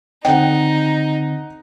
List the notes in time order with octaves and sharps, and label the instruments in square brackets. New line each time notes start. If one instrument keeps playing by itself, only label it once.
[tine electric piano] D3 C4 [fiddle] D#4 [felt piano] D#5 F#5 [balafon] G5